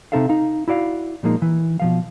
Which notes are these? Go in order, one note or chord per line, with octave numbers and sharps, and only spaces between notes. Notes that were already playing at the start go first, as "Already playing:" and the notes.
C3 C4 D#4 A4 E5 F5
D#4 F5
E4 F#4 D5 F5
A#2 F3 G#3 A#3 D#4
E3
B2 F3 F5